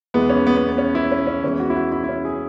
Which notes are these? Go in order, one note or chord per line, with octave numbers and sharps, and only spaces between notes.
E2 E3 G#3 B3
C#4
B3
B3
B3
C#4
E4
C#4
C#4
E2 E3 G#3 C#4
F#4
E4
F#4
E4
E4
C#4
G#4